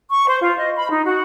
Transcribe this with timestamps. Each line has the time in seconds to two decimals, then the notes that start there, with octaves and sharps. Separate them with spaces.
0.09 C#6
0.26 C5
0.41 F4
0.58 D#5
0.75 B5
0.90 D#4
1.05 F#4